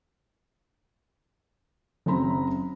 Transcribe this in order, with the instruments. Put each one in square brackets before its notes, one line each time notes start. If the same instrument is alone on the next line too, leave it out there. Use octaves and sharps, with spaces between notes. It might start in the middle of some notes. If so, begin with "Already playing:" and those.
[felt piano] F#1 F#3 C4 A#5 B5